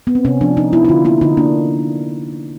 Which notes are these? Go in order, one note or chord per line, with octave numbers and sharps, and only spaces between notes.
B3
C4
C3 C#4
F3 D4
F3 D#4
B3 E4
E4
D3 F4
A#3 E4
D3 D#4
A#3 D4